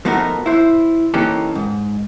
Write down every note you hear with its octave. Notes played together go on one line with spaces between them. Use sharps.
F3 A3 B3 D#4 F#4 A#4
E4 C5
E3 A#3 C#4 D#4 G4 A4
G#2